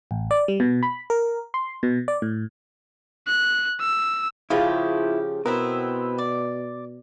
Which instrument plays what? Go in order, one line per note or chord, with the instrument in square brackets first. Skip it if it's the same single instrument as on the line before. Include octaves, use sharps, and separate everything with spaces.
[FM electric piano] A1
D5
G3
B2
B5
A#4
C6
B2
D5
A2
[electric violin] F#6
E6
[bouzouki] C#3 F3 G4 [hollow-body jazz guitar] E4 F4
[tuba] B2 [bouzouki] B3 C4 E4 [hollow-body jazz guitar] A#4
[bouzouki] D5